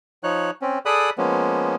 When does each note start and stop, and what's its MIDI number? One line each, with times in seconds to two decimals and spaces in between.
0.23 0.51 53
0.23 0.51 63
0.23 0.51 73
0.23 0.51 90
0.62 0.79 60
0.62 0.79 61
0.86 1.10 68
0.86 1.10 69
0.86 1.10 74
0.86 1.10 83
0.86 1.10 87
0.86 1.10 90
1.18 1.75 53
1.18 1.75 56
1.18 1.75 58
1.18 1.75 59
1.18 1.75 61